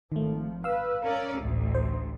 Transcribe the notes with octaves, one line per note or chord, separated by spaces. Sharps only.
G#1 D#3 F3 A3
B4 F5 E6
C#4 A#4 D5
A1 D2
C5